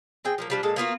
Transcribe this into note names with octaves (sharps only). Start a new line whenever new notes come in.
C4 G#4 G5
F3 F#3 A#3
F3 G3 D4
A#2 G#3 A4 A5
A#3 B3 F4 F#4